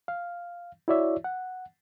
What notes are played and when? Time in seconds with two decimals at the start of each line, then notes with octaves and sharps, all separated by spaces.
0.08 F5
0.88 E4 F#4 C#5 D5 E5
1.24 F#5